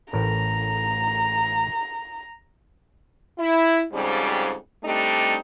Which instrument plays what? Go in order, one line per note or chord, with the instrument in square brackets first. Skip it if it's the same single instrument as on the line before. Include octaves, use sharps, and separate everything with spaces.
[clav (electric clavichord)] A1 A2 A#4 [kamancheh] A#5
[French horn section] E4
F2 G#2 C#3 G3
G3 A3 C4 D4 D#4 G4